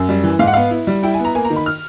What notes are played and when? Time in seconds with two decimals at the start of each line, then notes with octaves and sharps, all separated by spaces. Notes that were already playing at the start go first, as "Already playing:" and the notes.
Already playing: F#2
0.09 G3
0.24 E3
0.39 G#2 F5
0.47 F#5
0.53 B3 F5
0.71 E4
0.87 G3
1.03 E4 G5
1.14 G#5
1.19 B3
1.25 A#5
1.35 A#3 G#5
1.45 A#5
1.50 D#3
1.56 B5
1.66 F6